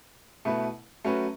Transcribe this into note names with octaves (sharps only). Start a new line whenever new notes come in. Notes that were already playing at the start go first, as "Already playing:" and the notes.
B2 A3 E4 B4
F#3 A3 C#4 F#4 B4